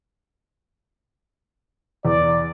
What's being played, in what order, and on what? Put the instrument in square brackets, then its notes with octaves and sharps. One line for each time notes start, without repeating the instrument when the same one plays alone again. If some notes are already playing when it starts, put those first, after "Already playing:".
[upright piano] E2 [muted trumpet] D5